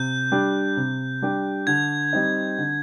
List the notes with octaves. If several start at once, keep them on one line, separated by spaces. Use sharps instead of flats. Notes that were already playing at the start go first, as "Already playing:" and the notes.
Already playing: C3 G6
G3 D4 G4
C3
G3 D4 G4
D3 G#6
G3 C4 D#4
D3